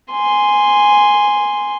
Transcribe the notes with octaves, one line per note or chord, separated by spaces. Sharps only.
G#5 C6